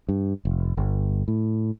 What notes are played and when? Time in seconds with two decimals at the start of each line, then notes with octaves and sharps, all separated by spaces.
0.09 G2
0.45 F1
0.77 G1
1.28 A2